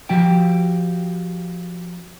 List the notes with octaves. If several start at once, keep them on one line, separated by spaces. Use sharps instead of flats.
F3 F#4 G4 G5